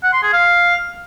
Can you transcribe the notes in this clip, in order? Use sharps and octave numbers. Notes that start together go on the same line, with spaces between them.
F#5
C6
G#4
F5